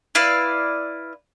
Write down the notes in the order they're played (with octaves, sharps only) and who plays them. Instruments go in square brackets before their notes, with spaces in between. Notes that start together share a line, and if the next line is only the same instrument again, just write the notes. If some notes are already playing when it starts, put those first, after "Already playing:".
[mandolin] E4 B4 D5 F5